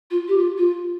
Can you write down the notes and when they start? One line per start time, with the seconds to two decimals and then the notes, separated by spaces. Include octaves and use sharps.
0.10 F4
0.28 G4
0.38 F4
0.57 F4